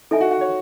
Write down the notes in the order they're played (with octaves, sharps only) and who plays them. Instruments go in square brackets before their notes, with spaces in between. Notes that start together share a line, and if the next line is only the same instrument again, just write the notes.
[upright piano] D#4 [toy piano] A4 E5 G#5
[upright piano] F#4
F#4
C#5